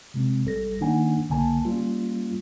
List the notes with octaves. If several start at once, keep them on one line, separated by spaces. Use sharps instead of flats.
C3 G#3 C4
A1 G3 A4 A#6
D#3 A#3 D4 D#4 F#5 G#5
B1 D3 A#3 G#5 A5
G3 A#3 C#4 F4